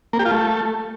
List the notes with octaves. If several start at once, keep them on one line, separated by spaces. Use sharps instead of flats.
A#3
G4
F4
A3